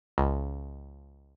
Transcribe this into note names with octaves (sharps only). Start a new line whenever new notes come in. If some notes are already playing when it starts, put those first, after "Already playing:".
C#2